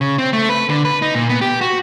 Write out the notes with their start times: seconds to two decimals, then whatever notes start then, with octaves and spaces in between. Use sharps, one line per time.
0.01 C#3
0.18 C4
0.33 A3
0.49 B4
0.70 D3
0.85 B4
1.02 D#4
1.15 A#2
1.29 B3
1.41 G4
1.61 F#4